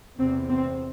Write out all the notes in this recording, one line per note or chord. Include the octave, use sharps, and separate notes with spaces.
E2 C3 C4
C4